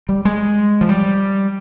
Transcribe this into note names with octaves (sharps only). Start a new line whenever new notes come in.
G3
G#3
F3
G3